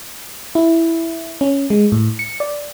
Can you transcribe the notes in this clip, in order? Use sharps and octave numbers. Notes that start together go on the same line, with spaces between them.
E4
C#4
G#3
A2
C#7
D5